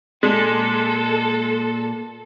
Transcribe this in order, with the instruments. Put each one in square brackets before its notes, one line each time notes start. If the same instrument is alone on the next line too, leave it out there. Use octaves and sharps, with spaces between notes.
[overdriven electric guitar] A#2 [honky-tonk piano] G#3 [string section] A4